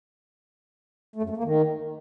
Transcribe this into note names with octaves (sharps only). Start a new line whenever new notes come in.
A3
F#2
A3
A#3
D#3